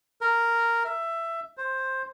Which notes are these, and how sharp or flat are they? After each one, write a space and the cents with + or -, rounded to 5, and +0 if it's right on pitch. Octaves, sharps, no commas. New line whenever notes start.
A#4 -5
E5 +15
C5 +10